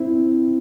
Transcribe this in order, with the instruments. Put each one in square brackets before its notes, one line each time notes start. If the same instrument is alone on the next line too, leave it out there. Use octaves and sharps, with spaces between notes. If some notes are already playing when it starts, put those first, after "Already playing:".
Already playing: [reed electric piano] C4 E4